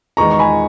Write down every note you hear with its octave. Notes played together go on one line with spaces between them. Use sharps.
E2 D#3 G#3 A#5 C#6
C#6
G#5 B5